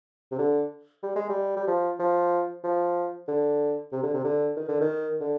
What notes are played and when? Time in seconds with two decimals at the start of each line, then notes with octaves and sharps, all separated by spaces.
0.31 C3
0.39 D3
1.03 G3
1.16 G#3
1.29 G3
1.56 G3
1.67 F3
1.99 F3
2.64 F3
3.28 D3
3.92 C3
4.03 D3
4.14 C3
4.24 D3
4.57 D#3
4.68 D3
4.81 D#3
5.20 D3